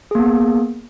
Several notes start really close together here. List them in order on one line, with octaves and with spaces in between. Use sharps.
G#4 A#3 B3